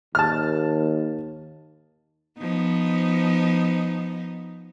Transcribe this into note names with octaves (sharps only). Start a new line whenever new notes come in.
D#2 A5 F6
F3 B3 D#4